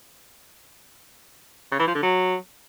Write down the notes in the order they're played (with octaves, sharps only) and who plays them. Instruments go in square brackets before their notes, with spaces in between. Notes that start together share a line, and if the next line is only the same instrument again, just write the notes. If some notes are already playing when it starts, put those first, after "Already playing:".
[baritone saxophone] C#3
E3
F3
D3
F#3